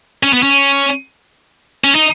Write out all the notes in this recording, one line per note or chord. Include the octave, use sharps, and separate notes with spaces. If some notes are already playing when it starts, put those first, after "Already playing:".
C#4
B3
C#4
C#4
D#4